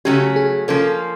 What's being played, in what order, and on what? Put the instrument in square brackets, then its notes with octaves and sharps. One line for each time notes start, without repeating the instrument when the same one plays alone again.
[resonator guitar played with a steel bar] C#3 F#3 A3 C#4 [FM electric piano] G4
[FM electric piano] G#4
[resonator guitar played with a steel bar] F3 A#3 C#4 [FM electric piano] A4